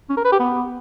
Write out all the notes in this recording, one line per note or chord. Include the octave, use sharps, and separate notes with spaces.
C#4
A#4
B4
G4
B3